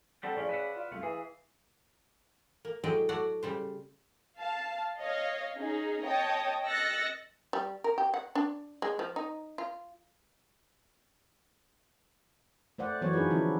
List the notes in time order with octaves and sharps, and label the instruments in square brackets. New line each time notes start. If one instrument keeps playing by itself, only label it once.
[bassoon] D3 [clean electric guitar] G3 C4 A4 [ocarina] F#5
[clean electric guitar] A2 F3 C#4 [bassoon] C#3 [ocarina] D5
[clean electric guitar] B4 E5 F#5
[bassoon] F4
[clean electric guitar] C2 F#2 A3 [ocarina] F5
[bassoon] E3 [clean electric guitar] G#4
[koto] A#3
A2 F#3 G#3 D5 D#5 G5
A3 F#4 C#5 D5 F#5
C#3 G3 C5
[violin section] F5 A5
C#5 D#5 F5
C#4 D#4 G#4
C#5 D#5 G5 A5 D#6
D#5 E6 F#6 A6 A#6 C#7
[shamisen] G3
A#4
G4
F#5
D4
G#3
F3
D#4
F4
[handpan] A3 C5 D5 F#5
E3 F#3 B3 F#4 C5 C#5
D4 D#4 F4 G#4 B4
D3 F3 C#4 E4